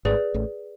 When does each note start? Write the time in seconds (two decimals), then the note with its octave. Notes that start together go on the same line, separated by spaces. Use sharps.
0.05 G#1 G#2 G#4 B4 D5
0.34 A1 A2